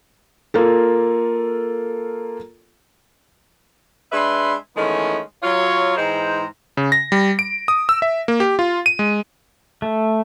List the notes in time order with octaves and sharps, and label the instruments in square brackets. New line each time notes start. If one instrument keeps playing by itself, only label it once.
[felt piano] A#3 F4 A4
[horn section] G#3 D4 B4 E5 B5 C6
D#3 E3 G#3 A3 B3 C#4
F#3 F4 C#5
G#2 E3 G#3 C5 G5 A#5
[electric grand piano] C#3
A#6
G3
D7
D#6
E6
E5
A#3
G4
F4
D#7
G#3
[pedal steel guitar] A3